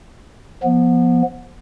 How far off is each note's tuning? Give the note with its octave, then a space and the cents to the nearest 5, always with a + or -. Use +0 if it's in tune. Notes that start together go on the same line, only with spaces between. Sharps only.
F3 +0 B3 -25